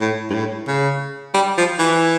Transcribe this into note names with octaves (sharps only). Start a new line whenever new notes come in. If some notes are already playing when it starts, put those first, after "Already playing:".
A2
G2
A2
C#3
G3
F3
E3